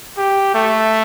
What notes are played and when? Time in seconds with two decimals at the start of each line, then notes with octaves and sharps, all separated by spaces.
0.17 G4
0.55 A3